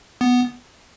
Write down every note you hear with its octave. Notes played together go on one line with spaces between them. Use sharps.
B3